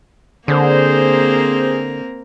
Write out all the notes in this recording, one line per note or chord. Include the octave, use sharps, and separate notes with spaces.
D3 A#3 C4 G#4 A#4 C5